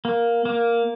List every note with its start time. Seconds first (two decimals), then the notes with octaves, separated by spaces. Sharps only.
0.05 A#3
0.45 A#3